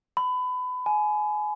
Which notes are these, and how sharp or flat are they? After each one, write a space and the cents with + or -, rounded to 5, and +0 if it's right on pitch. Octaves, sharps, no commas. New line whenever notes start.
B5 +25
G#5 +25